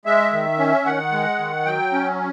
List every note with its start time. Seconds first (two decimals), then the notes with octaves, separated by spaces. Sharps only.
0.05 G#3 E5
0.32 D#3
0.59 C#4
0.86 D#3 F#5
1.12 G#3
1.39 D#3
1.66 F#3 G5
1.93 C#4